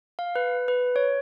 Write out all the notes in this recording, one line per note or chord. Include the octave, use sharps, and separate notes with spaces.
F5
B4
B4
C#5